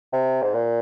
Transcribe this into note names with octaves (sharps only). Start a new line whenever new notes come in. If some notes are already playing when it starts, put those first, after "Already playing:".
C3
G#2
A#2